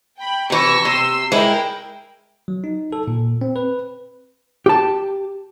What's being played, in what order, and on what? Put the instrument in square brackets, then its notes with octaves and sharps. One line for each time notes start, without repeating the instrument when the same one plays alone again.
[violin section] G5 B5
[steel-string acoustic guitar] C3 E3 [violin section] C#6 E6 A#6
[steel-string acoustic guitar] C3 [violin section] C6 E6
[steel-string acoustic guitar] G#3 E4 [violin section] A#4 G5
[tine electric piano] F#3
D#4
A4
A#2
C4
B4
[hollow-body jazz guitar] G4 A5